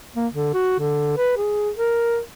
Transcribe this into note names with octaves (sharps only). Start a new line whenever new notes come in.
A#3
D3
F#4
D3
B4
G#4
A#4